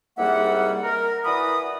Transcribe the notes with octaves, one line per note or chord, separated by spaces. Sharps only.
C2 G#2 G3 A#3 E5 F#5
A#4
E3 F#4 D5 B5 D#6